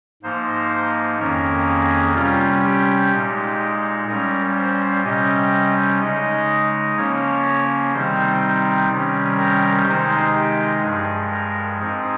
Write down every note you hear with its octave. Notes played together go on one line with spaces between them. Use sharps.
G#2 F3 A#3 D#4 C5
F2 D#3 A#3 C#4 A#4
G#4
C3 G3 C#4 F4
G4
A#2 G#3 D#4
A#2 G3 C#4 A#4
C5
C3 G3 C#4 D#5
C#3 G#3 D#4 D#5
C#3 F3 A#3 C#4 C#5
C3 D#3 G3 C4 D#4 C5
C3 D#3 G3 C#4
A#4
C3 D#3 G#3 D#4 C5
G4
G2 F3 G#3 G#4
A#4
G#2 F3 C4 D#4 G#4